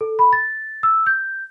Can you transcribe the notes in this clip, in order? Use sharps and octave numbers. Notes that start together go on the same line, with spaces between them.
A4
B5
A6
E6
G6